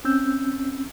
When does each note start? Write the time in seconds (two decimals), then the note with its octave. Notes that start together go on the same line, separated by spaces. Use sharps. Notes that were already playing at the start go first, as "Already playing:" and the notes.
0.05 C4 C#4 E6 G6